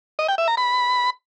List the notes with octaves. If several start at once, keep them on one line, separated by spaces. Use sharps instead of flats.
D#5
G5
E5
A#5
B5